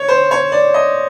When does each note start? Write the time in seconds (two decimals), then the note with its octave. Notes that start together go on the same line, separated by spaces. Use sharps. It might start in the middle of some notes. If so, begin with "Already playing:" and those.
Already playing: C#5
0.08 C5
0.31 C#5
0.52 D5
0.74 D#5